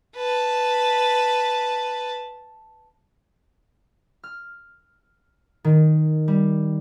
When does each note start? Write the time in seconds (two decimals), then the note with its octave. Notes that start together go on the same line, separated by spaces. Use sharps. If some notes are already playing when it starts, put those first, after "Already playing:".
0.16 B4 A5
4.24 F6
5.64 D#3
6.28 G3